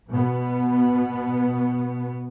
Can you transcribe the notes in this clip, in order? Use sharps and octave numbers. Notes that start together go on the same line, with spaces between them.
B2 B3